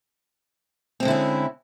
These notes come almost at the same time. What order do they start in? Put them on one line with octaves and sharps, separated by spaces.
C4 G#3 D3 E4 C#4